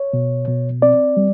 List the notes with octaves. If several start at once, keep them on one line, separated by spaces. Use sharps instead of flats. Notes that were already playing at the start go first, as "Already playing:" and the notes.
Already playing: C#5
B2
B2
C4 D5
G3